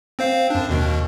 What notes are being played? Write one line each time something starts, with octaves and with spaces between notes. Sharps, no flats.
C4 C5 F5
F#2 D4
D#2 B2 D#3